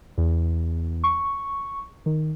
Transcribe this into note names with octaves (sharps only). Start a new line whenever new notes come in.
E2
C#6
D#3